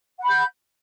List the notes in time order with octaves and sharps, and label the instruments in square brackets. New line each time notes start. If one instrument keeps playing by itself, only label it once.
[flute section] F#5
B5
G6